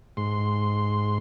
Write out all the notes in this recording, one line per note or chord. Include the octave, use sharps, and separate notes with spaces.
G#2 C6